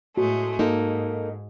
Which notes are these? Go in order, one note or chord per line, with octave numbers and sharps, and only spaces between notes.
A2 G#3 A3 F#4
G#2 A#3 D#4 A4